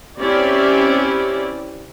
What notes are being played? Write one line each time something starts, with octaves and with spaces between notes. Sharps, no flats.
C4 C#4 E4 G4 D5